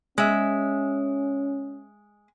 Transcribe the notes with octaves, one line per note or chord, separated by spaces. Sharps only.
G#3 C#4 E5